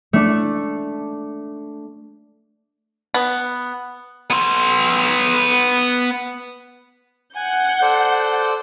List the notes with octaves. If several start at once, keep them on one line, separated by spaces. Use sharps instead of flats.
A3 D4
B3
B3 C6
F#5 G#5 G6
A4 C5 D5